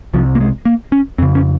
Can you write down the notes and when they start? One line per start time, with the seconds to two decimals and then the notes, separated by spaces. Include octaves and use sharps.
0.14 C2 C3 F3
0.35 A#3
0.40 G#3
0.65 A#3
0.92 C#4
1.18 F2 C4
1.22 C#3
1.35 C#4